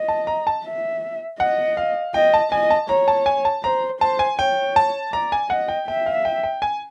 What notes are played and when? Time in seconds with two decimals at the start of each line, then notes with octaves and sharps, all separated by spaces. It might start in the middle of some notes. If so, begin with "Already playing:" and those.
Already playing: D#5
0.08 A5
0.27 A#5
0.47 A5
0.64 E5
1.40 D#5 F#5
1.77 F5
2.14 D#5 G5
2.34 A5
2.52 D#5 G#5
2.70 A5
2.89 C#5 A#5
3.08 A5
3.26 G#5
3.45 A5
3.64 C5 A#5
4.01 C5 A5
4.19 G#5
4.39 C#5 G5
4.76 A5
5.13 D5 A#5
5.32 G#5
5.50 D#5 F#5
5.68 G5
5.87 E5 G5
6.06 F5
6.25 G5
6.43 G5
6.62 G#5